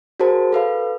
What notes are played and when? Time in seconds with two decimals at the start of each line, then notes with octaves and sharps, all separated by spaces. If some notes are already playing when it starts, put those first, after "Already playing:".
0.20 F#4 G#4 A#4 C5 A5
0.52 A4 B4 F5